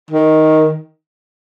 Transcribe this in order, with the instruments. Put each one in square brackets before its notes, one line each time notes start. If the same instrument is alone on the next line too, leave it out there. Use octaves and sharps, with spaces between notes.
[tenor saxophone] D#3